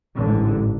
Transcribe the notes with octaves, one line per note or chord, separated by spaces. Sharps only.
A1 G#2 D3